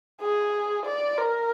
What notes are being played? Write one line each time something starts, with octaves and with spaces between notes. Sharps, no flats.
G#4
D5
A#4